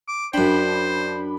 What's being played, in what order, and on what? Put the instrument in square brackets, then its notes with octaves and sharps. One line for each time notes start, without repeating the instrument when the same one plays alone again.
[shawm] D6
[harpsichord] F#2 G5 [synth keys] D4 B5 [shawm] C5